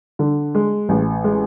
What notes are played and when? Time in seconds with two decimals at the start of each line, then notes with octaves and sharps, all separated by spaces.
0.19 D3
0.55 G#3
0.89 A1
1.24 G#3